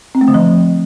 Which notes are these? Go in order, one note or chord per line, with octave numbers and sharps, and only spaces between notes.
C4
A3
D3
F3